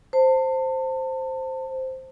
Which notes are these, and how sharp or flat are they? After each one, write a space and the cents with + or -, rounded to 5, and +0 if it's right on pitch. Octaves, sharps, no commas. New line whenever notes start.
C5 +0 A5 +30